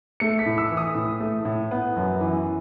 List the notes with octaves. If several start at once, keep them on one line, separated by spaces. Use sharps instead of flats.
A3 C#7
B6
A2
E6
E3
D#6
A2
A3
A2
B3
F#2
E3